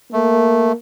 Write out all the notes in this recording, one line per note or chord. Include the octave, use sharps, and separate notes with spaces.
A3 A#3